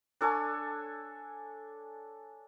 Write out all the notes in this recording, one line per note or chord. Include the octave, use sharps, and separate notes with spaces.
D4 A4 C#5 G#5